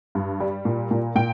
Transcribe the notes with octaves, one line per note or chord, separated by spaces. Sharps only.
G2
G3
A#2
A#2
A#2 G5